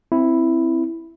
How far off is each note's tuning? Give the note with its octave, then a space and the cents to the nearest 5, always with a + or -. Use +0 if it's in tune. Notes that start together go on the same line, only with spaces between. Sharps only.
C4 +0 E4 +0